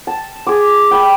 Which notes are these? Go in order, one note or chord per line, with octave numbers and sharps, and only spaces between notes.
A5
G#4 D6
G5 B5